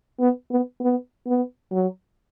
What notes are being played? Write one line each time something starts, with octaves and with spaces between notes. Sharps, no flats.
B3
B3
B3
B3
F#3